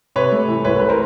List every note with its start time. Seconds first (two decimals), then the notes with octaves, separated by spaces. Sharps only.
0.16 C3 B4 C#5
0.32 A3
0.48 E3
0.64 C2 B4 C#5
0.80 A3 B4
0.89 A#4 C5